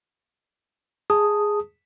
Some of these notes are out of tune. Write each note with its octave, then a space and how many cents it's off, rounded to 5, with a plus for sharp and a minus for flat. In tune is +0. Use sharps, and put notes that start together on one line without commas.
G#4 +0 A5 +0 D#6 +0